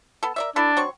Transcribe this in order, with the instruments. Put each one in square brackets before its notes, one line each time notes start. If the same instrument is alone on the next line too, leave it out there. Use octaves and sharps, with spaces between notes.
[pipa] B3 A4
A#4 D5 E5
[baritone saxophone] D4 [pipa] E4 A4
[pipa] F#3 C4 C#6